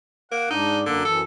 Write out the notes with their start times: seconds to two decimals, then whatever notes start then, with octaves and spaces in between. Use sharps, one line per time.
0.32 A#3 F#5
0.50 G#2 D4 D#4
0.86 F#2 D3 A#3
1.05 F#2 E3 A4